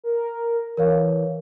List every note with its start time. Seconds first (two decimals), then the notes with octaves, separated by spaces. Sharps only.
0.04 A#4
0.77 E3 A#4 C#5 F5